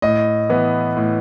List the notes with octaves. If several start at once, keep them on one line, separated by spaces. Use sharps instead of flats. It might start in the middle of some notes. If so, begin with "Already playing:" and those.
A2 D#5
E3 B3
A2